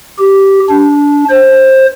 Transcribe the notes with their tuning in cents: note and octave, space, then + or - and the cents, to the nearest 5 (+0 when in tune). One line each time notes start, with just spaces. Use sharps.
G4 -10
D4 -20
C5 +20